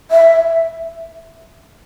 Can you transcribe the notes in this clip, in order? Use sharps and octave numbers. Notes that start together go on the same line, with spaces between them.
E5